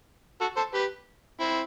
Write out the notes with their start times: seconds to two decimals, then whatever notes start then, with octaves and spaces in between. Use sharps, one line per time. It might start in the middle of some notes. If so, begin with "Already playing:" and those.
0.41 F#4 A4
0.56 A4 C5
0.74 G4 B4
1.40 C4 E4